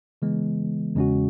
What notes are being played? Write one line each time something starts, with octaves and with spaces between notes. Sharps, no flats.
C#3 E3 G#3 B3
E2 C#3 G#3 C#4 F#4